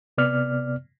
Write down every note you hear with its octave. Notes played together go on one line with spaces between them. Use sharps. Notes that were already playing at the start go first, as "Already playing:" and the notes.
C3 B3 D5 F6